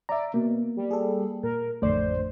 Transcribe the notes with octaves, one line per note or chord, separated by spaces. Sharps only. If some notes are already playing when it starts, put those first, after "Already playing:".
D5 E5 A#5
B2 A#3
G3
G#4 A4
A#2 A#4
A1 F2 D3 A3 C5 D5